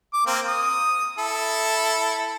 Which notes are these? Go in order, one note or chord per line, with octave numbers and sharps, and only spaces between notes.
D6
A#3 C4
D#6
E4 A4